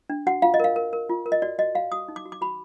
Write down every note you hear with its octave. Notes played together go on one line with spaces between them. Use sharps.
D4
F#4 F#5
F4 F5
D#5
A#4 F5
A#4
A#4
F4
A#4
D#5
F#4 D5
F#4 D#5
F#4 F5
F#4 D#6
D#4
D6
F#4
D6
F#4 B5